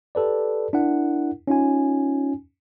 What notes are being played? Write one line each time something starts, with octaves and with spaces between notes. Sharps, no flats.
G4 A4 B4 D5
D4 E4 A#4 F#5
C#4 D#4 F4 G#5